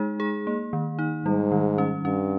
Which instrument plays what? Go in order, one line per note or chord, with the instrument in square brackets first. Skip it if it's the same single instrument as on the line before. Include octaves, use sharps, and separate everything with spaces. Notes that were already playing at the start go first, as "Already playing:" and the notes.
Already playing: [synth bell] G#3 D#4 G#4
G#4
A#3
D#3
D#4
[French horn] G#2 [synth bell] G3
[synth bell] D#3
C#4
[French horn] G2 [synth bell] C#4